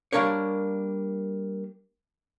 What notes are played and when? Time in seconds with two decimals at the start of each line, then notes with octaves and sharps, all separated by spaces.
0.13 G3 A#3 D4 A#4 C#5